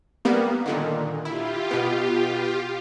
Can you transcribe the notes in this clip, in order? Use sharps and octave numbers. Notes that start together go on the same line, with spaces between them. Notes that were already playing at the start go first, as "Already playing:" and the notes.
G3 A#3 B3
A#2 D3 D#3
E4 F4 G4
B2 B3